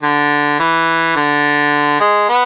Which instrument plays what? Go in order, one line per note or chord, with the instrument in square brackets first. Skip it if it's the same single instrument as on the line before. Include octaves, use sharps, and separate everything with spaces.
[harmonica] D3
E3
D3
G#3
B3